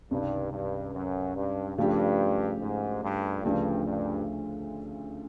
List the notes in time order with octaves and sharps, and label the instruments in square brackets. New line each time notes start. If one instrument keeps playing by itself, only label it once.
[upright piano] C#2 C3 D#3 [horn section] G2
[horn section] G2
F#2
G2
[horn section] G2 [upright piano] C#3 F3 A3 D4 G4
[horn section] G#2
G2
[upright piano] D2 C#3 F3 A3 D4 [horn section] G2
[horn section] G2